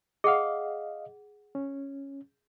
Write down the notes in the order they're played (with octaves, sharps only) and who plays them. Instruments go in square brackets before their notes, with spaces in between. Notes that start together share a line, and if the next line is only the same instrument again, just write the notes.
[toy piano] G#4 F#5 [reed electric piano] D#5 F5
[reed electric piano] C#4